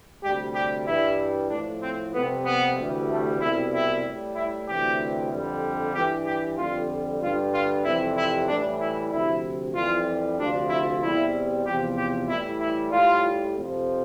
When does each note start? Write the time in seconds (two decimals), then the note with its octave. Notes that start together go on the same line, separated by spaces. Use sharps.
0.24 D2 C3 G3 G4
0.55 G4
0.87 G2 E3 G3 E4
1.50 A2 F3 D4
1.83 C4
2.14 F2 C3 G3 B3
2.46 B3
2.78 D2 C3 E3 G3
3.09 A3
3.40 C2 B2 G3 E4
3.73 E4
4.05 A2 G3
4.36 E4
4.68 D2 C3 E3 G3 G4
5.31 F2 D3 G3
5.95 G2 E3 G3 G4
6.26 G4
6.58 F2 D3 G3 F4
7.21 G2 D3 G3 F4
7.53 F4
7.85 F2 C3 E3 G3 E4
8.17 E4
8.48 A2 E3 G3 D4
8.81 E4
9.12 D2 C3 F3 E4
9.75 F2 E3 G3 F4
10.39 D2 C3 F3 D4
10.70 E4
11.02 E2 C3 G3 E4
11.66 E2 C3 F3 G4
11.98 G4
12.29 A2 E3 G3 E4
12.60 E4
12.92 A2 G3 F4
13.55 F2 C3 F3